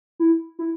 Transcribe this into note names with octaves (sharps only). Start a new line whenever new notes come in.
E4
E4